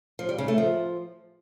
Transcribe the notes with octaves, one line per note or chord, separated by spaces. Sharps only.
F3
G3
C#3
A3
F3